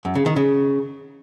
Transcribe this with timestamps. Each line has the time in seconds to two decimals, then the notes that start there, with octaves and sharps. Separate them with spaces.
0.05 F#2
0.15 C#3
0.26 D#3
0.36 C#3